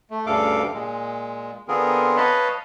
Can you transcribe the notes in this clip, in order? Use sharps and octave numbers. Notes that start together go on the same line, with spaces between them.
A3
D2 G2 C#3 A4 F5 D6
A#2 G#3
D3 B3 C4 F4 G#4 A#4
B4 C#5 D#5 F5 A5 B5